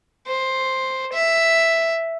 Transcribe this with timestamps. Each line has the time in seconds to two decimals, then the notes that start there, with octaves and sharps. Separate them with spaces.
0.27 C5
1.13 E5